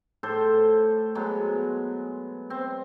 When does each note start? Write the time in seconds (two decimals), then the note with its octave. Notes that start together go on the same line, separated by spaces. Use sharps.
0.23 A2 A4 C5
1.15 F#3 G#3 B3
2.50 C4